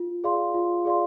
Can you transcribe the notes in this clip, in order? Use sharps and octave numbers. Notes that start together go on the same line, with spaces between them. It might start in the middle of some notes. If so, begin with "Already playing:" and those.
Already playing: F4
G#4 D5 F5 C6
F4
G#4 D5 F5 C6